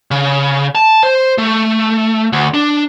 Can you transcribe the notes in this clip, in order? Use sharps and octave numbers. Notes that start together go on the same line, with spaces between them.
C#3
A5
C5
A3
D2
D4